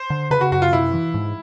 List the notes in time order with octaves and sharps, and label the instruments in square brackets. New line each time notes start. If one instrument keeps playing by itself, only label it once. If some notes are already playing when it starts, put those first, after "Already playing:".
Already playing: [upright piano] C5
[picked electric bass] D3
[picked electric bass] C#3 [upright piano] B4
[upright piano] F#4
[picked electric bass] F#2 [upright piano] F#4
[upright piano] F4
[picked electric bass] C3 [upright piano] E4
[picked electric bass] E3
G#2